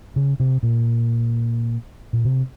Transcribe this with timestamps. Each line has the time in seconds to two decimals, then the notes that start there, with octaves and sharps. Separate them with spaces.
0.16 C#3
0.40 C3
0.63 A#2
2.13 A#2
2.25 C3